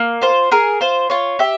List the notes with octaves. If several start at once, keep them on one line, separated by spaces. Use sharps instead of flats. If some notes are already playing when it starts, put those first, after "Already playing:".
Already playing: A#3
F4 C5
G#4 A#4
F4 C5
F4 C#5
G4 E5